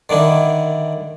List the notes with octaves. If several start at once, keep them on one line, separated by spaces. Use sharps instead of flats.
D3 D#3 D4 E4